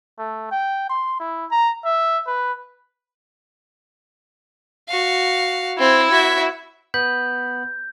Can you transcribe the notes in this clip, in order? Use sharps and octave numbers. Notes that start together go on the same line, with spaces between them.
A3
G5
C6
E4
A#5
E5
B4
F#4 F5
C4 E4
F#4 E5
B3 B5 G6